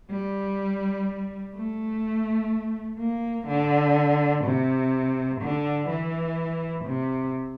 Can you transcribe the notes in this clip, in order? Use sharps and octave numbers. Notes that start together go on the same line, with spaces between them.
G3
A3
A#3
D3
C3
D3
E3
C3